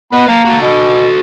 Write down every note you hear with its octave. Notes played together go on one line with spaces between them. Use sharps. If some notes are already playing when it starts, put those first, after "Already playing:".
B3 B4 D#5
A#3 F5 A5
F#4 A4
B2